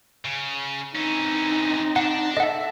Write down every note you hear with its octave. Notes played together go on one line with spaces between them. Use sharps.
C#3
E3 C4 C#4 D#4
D4 F#5
A4 D#5 E5 F#5